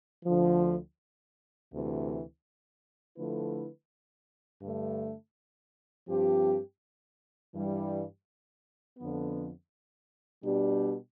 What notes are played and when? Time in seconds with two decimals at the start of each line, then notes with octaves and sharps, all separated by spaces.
0.25 D2 D3 F3
1.71 D2 C3 E3
3.16 D3 F3 A3 E4 B4
4.61 G2 D3 A3
6.07 G2 F3 C4 G4
7.53 G2 E3 G3
8.97 F2 D3 F3 B3
10.44 B2 G3 D4 G4